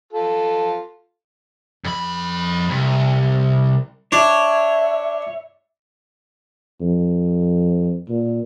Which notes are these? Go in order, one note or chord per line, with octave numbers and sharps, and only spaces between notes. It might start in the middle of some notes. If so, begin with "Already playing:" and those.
F4 A4
F2 B5
C2
D4 C#5 E5
F2
A#2